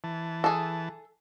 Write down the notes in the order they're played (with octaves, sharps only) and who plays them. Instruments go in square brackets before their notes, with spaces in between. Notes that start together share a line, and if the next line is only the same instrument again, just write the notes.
[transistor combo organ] E3 A5
[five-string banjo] G#4 A4